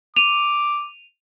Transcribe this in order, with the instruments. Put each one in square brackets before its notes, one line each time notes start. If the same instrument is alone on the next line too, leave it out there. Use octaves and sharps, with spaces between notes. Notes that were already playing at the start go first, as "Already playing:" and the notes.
[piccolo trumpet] D6 [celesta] D#7 F7